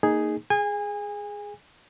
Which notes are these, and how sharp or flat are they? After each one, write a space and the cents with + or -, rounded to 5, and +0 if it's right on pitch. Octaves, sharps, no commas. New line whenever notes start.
A#3 -20 D#4 +0 G#4 +0
G#4 +0 G#5 -30